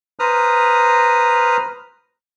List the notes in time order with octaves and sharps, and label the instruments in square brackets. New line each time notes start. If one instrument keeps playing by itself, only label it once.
[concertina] B4 C5 A#5 D#6 F6